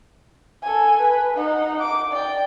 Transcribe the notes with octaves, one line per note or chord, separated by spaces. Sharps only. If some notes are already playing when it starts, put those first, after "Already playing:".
A4 G#5
B4
D#4 F#5
D6
D5 G5